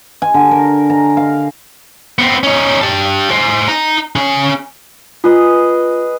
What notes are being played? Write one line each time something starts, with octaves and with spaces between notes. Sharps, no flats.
G#5
D3
A#4
A#5
F5
B3 C4
C#4 D#4
G4 A5
G#4 C5
D#4 A#5
C#4 G#4
F4 G#4 B4 D#5